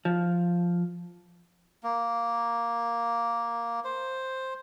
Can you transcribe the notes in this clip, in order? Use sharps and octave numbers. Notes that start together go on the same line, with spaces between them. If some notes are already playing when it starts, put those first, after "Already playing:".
F3
A#3
C5